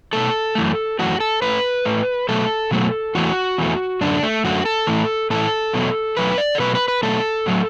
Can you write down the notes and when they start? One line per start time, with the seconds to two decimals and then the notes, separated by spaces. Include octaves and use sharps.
0.13 B2 A3 A4
0.55 F#2 E3 A3
0.99 F#2 E3 A3 F#4
1.20 A4
1.42 A2 A3 B4
1.85 A2 A3
2.29 B2 F#3 A3 A4
2.71 B2 F#3 A3
3.15 E2 E3 A3 F#4
3.58 E2 E3 A3
4.01 F#2 D3 A3 D4
4.23 A3
4.44 F#2 D3 A3 F#4
4.66 A4
4.87 A2 E3 A3
5.30 A2 E3 A3 A4
5.73 E2 B2 F#3 A3
6.17 E2 B2 F#3 A3 B4
6.38 D5
6.55 A4
6.59 B2 F#3 A3 B4
6.75 B4
6.88 B4
7.03 B2 F#3 A3 A4
7.46 A2 F#3 A3